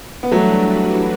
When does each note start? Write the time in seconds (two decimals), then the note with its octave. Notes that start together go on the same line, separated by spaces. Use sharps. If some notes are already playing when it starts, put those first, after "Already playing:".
0.23 B3
0.31 E3 F#3 G3 A3 D4 F#4 B4